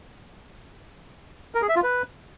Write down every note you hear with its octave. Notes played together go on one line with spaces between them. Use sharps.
A#4
G#4
E5
F4
B4